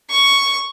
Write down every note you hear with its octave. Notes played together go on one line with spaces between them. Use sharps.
C#6